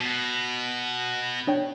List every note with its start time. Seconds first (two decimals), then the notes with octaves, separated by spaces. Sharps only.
0.01 B2 B3
1.47 D4 C#5 G5